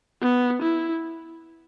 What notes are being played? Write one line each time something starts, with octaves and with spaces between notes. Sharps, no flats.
B3
E4